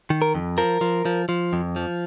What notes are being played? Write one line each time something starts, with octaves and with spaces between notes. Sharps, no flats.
D#3
A#4
F2
F3 A#4
F3
F3
F3
F2
F3